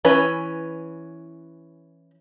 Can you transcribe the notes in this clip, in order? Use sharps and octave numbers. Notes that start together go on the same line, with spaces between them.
E3 C#4 B4